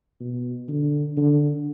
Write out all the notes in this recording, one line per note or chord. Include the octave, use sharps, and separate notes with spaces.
B2
D3
D3